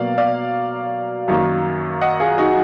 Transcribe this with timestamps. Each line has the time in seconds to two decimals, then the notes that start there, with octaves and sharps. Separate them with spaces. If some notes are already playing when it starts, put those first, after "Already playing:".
Already playing: B2 F#3 A#3 D5 F5
0.18 D5 F5
1.28 F#2 D#3 F#3 A#3
2.01 D#5 F#5
2.20 F4 G#4
2.38 D#4 F#4